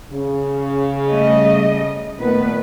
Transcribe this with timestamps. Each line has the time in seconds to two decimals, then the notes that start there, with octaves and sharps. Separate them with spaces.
0.12 C#3
1.09 G3 A3 D#5
2.20 A#2 D#3 A3 B3 B4